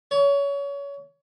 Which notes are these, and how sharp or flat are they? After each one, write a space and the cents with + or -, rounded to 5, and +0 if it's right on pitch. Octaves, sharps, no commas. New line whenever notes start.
C#5 +25